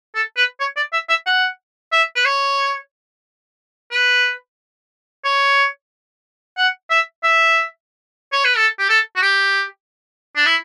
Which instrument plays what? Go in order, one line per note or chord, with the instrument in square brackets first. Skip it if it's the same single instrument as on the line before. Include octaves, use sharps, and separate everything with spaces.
[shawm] A4
B4
C#5
D5
E5
E5
F#5
E5
B4
C#5
B4
C#5
F#5
E5
E5
C#5
B4
A4
G4
A4
F#4
G4
D4
E4